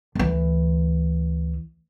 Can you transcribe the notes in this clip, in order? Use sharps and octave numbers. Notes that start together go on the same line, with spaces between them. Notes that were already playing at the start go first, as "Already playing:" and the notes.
D2 E3